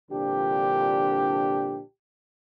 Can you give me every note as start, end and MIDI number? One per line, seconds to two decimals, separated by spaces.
0.11 1.81 36
0.11 1.81 46
0.11 1.81 50
0.11 1.81 53
0.11 1.81 62
0.11 1.81 67